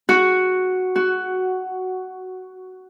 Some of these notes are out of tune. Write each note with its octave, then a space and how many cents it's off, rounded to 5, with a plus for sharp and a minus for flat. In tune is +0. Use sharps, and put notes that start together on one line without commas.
F#4 +0
F#4 +10